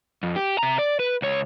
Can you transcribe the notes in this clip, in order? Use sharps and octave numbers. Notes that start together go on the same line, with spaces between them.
F2
G4
C3 A#5
D5
B4
C#2 C#5